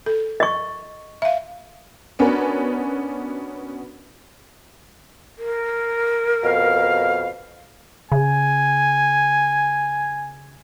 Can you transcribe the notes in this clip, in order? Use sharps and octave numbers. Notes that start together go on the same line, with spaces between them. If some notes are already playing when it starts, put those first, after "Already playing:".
A4
D#5 C#6
E5 F5
B3 C#4 D4 F#4 A#4 B4
A#4
F2 B2 F5
C#3 G#5